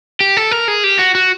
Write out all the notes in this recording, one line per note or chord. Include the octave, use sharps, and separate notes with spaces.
G4
A4
A#4
G#4
G4
F#4
F#4